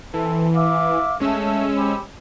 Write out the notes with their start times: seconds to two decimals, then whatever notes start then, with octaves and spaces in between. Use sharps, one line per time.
0.14 E3 C4 A4
0.54 E5 F5 D6
1.20 G#3 A3 C#4 E6
1.75 G4 C5 B5